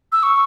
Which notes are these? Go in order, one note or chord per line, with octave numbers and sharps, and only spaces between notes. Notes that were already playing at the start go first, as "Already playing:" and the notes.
E6
C#6